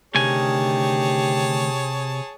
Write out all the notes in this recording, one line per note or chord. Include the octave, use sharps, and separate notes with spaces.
D2 C3 D#3 G4 G#4 C#5 G#5 A5